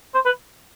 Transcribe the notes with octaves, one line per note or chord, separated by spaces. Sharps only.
C5
B4